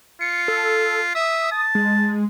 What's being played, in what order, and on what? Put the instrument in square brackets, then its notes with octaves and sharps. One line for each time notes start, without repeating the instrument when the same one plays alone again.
[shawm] F4 [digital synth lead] C#7
[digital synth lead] A4
[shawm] E5 [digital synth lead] D#6
[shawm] A5
[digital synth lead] G#3